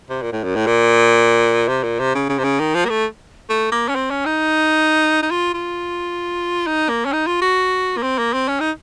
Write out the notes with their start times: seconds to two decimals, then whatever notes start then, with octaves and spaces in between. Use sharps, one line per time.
0.10 C3
0.22 A#2
0.33 A2
0.44 F#2
0.56 A2
0.67 A#2
1.68 C3
1.83 A#2
1.99 C3
2.15 C#3
2.29 C#3
2.39 C3
2.44 C#3
2.60 D#3
2.75 F3
2.85 A#3
2.90 A3
3.50 A3
3.72 A#3
3.89 C#4
3.96 C4
4.10 C#4
4.26 D#4
5.23 D#4
5.31 F4
5.54 F4
6.67 D#4
6.89 A#3
7.05 C#4
7.13 D#4
7.27 F4
7.42 F#4
7.97 A#3
8.03 C4
8.18 A#3
8.34 C4
8.48 C#4
8.60 D#4